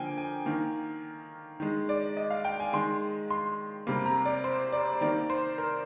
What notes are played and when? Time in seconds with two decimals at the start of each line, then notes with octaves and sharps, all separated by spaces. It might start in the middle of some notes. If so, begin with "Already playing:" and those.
Already playing: D3 F3 A#3 G5 G#5
0.18 G#5
0.46 D#3 A#3
1.60 D#3 G#3
1.89 D5
2.17 D#5
2.30 F5
2.45 G5
2.60 G#5
2.73 D#3 G#3 C6
3.30 C6
3.87 C3 G3 A#3
4.06 A#5
4.25 D5
4.44 C5
4.72 D5
5.01 D#3 A#3 D5
5.30 C5
5.58 A#4